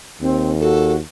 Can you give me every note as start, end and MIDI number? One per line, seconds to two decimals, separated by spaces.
0.21 1.00 39
0.21 0.51 60
0.61 0.96 66
0.61 0.93 69